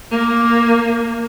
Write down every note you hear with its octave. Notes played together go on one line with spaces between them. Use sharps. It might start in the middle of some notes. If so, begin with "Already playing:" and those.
A#3